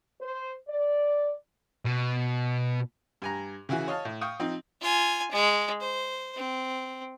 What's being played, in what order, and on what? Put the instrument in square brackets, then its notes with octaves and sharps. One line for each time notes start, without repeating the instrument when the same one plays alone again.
[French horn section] C5
D5
[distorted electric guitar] B2
[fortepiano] G2 G#5 A#5
C#3 E3 E4 F#4 G#4
C#5 D#5 F5 A5
A2
F5 G5 C#6 D#6
F3 C4 D#4
[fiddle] F4 G#5
G#3
C5
C4